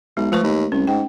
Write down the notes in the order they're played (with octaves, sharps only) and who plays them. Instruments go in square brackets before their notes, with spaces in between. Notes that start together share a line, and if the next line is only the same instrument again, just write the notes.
[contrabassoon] B1 [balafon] G#3
[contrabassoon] F3 [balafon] A3 B4 C#6
[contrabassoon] D#2
[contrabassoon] C2 [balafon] C#4
[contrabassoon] G#2 [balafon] G5